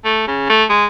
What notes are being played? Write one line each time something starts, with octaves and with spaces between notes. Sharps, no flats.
A3
C#3
A3
G#3